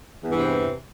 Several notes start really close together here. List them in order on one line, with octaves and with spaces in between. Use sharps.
E2 G2 E3 C3